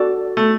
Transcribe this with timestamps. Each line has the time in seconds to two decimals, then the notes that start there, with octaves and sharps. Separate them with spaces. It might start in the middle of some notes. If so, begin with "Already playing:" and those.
Already playing: F#4 A4 D5
0.37 A3